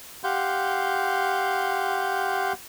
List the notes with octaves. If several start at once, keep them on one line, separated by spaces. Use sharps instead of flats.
G4 F5 F#5 C6 G6